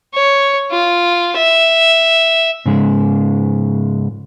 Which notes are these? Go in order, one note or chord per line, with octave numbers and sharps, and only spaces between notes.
C#5
F4
E5
G#2 C#3 G#3